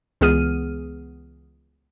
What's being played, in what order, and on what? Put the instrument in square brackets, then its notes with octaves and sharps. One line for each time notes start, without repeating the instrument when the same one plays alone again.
[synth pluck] C#2 E3 B3 G#4 F6 D#7